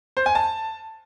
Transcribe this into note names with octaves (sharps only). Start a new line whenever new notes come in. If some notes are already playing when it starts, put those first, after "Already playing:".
C5
G#5
A5